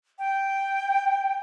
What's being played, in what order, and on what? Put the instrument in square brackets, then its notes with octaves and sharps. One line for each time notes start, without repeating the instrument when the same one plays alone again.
[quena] G5